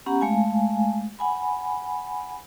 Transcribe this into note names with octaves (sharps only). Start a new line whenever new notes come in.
B3 C#4 G4 F#5 A#5
G#3 A3 F5 G#5
F#5 G#5 B5